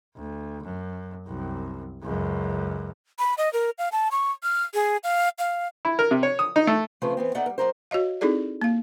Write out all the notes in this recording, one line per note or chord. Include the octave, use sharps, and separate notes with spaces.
D2
F#2
C2 F#2
C#2 F#2
B5
D#5
A#4
F5
A5
C#6
F6
G#4
F5
F5
E4
A#4
C3
C#5
D#6
D#4
A3
C#3 F3 A3 C4 G#4 B4
E3 B3 C4
B3 D#4 A4 D5 E5 F#5
G3 A#4
F#2 D#3 A#4 C5
F#4 C#5 D#5 F5
C4 D#4 E4 G#4 A4 D5
A#3 F5